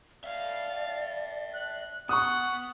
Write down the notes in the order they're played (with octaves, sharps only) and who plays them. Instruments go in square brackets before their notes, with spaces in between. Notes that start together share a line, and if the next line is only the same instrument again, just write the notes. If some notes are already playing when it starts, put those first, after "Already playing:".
[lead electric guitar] C#5 E5 [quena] D5 [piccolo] F5
[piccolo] F#6
[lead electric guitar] B3 [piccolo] F#5 [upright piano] C#6 D#6